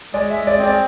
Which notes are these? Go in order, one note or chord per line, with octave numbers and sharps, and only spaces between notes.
G#3 D5
E5
G#3
D5
C4
D5